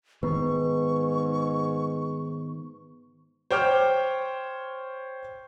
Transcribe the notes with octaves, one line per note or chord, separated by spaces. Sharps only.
G#2 D#3 B3 B4 C#6
C5 C#5 G5 D6 F6 G6